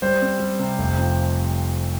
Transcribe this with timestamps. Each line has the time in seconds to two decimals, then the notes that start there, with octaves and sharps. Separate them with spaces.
0.02 G3 C5
0.22 C4
0.40 G3
0.59 C3
0.79 F1
0.98 F2